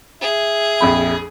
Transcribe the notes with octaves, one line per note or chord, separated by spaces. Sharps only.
G#4 E5
A#1 F2 B5